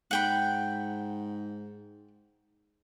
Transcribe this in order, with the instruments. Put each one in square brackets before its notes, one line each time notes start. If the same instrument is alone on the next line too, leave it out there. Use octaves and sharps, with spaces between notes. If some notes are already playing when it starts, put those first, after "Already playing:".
[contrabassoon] G#2 [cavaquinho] F#5 G5 B5